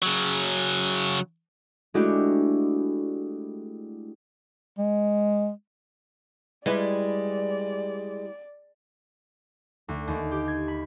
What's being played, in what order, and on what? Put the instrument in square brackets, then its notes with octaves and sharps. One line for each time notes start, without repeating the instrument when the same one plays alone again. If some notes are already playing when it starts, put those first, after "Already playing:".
[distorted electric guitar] C#3 F#3
[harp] G#3 A3 D4 E4 F#4 G4
[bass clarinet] G#3
[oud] G3 E4 B4 [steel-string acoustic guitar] G#3 [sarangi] D5
[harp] D2
D#2
G4
G#6
B5